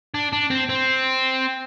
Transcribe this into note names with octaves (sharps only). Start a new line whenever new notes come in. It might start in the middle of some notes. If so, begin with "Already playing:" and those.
D4
D4
C4
C4